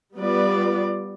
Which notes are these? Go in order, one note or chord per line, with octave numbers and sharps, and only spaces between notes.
G3 B3 F4 B4 D5